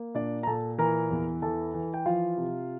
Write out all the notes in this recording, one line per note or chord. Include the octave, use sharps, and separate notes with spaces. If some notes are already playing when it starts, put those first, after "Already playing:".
Already playing: A#3
A#2 D4 D5
A#5
A#2 A4 A5
E3 A#4 A#5
E2
E3 A4 A5
E3
G5
F3 F4 F5
C3